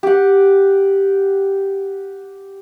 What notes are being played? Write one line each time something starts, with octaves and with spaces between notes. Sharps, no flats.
G4 F#5